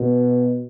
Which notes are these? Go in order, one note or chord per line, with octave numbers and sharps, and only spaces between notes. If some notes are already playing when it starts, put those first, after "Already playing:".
Already playing: B2